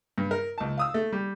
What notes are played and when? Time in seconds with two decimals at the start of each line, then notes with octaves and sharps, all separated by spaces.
0.18 G2
0.31 A#4
0.58 C#2 A5
0.78 F5 D#6 E6
0.94 A3
1.12 G3